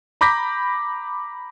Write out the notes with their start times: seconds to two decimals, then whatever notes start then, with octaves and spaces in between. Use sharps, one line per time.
0.21 A#5 B5 D6 G6 A#6 B6